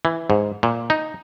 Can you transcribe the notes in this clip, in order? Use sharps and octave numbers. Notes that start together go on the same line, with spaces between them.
E3
G#2
A#2
D#4